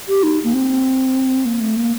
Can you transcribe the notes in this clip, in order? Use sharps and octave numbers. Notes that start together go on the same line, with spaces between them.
G4
D#4
A#3
C4
A#3
A3
A#3